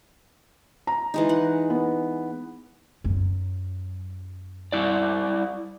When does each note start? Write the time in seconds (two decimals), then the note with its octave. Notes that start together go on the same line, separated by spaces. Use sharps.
0.87 A#5
1.14 E3 G#3 D#4
1.29 F#5
1.70 B3
3.04 F#2 F#3
4.72 G3 E4 D5